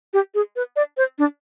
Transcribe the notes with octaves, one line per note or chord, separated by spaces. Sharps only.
G4
G#4
B4
D5
C5
D4